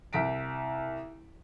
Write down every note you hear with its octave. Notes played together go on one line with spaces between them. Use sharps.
C2 B6 D7